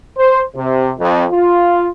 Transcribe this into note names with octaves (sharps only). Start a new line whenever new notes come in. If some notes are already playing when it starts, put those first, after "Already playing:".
C5
C3
F2
F4